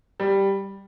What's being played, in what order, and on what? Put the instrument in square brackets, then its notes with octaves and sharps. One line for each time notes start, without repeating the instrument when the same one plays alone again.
[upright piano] G3